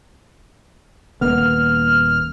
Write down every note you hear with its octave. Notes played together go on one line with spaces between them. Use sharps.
D#1 A#3 B3 F6